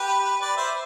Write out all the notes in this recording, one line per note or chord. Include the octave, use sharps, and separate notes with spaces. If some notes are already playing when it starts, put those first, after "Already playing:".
Already playing: G4 B4
B4 D5
C5 E5